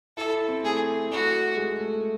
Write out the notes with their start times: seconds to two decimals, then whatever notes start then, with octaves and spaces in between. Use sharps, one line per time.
0.17 E4 A4
0.48 C4
0.64 A3 G#4
1.11 A3 F#4
1.57 G#3
1.80 A3